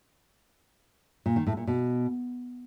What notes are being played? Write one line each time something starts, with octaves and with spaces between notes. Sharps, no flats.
A#2
D#3
A2
A#2
B2